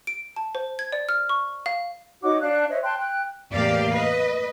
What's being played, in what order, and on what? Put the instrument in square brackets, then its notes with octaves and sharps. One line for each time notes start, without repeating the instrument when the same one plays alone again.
[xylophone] D7
A5
C5
G#6
D5
F6
C#6
F5
[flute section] D#4 F#4 C#5 D6
D4 F5 F#6
C5 C#5 D#5 E5
G5 A5 C6 F#6
G5 F#6
[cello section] E2 A2 A#3 G4 D5 F5
B4 D#5